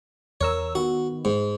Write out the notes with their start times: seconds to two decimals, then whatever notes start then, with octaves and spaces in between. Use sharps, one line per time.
0.41 E2 A#4 C#5 E6
0.75 D#3 B3 F#4
1.25 G#2